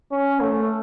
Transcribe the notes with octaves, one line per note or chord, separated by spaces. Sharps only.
C#4
A3